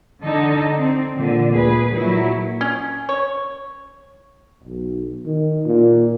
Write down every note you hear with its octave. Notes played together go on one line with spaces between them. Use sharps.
D3 D#4 A4
C4
A#2 D3
D2 G#4 B4
A#2 F#3 E4
C#4
C#5
B1
D#3
A#2